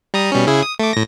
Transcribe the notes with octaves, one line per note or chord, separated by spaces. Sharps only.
G3 A#5 D#6
B2 G3 C#4
C#3 E4 G#4
D#6
A3 D6
A2 A#6